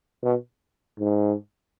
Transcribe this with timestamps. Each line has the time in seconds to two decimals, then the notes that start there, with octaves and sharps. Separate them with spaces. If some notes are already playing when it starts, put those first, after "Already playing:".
0.23 B2
0.99 G#2